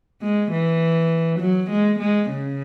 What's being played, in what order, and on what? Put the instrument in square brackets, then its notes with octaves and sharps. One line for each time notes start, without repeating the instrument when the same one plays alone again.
[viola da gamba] G#3
E3
F#3
G#3
G#3
C#3